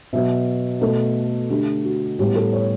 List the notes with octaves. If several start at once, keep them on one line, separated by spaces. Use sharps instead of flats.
B2 F#3 B3 E5
B2 A3 A4
D3 A3 G4
F#4
A2 G3 B3 G4
A4
C#5